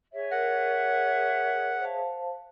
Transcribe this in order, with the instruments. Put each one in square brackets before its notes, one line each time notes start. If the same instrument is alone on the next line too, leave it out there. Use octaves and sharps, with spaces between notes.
[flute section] G#4 C#5 E5
[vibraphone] A#4 [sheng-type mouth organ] F#5
[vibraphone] C5 F5 A5